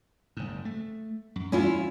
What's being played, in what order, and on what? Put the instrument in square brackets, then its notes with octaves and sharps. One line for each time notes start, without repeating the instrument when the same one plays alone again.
[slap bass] F#1 G#2
A3
F#2
[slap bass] E2 G2 F#3 [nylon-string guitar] C#4 E4 F4